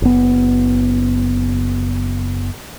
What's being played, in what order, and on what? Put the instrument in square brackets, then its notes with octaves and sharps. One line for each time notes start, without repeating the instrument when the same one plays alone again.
[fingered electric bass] F#1 B3